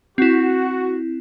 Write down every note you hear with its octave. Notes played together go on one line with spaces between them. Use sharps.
C4 E4 F#4